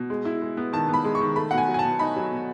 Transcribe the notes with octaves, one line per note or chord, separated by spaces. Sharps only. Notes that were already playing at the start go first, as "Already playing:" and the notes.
Already playing: B2
G#3
E4
G#3
B3
D#3 A5
B3
B5
G#3
C#6
D#3
A3 B5
B2 F#5
G#5
F#3
G#5
A5
B2
D#4 B5
F#3
B2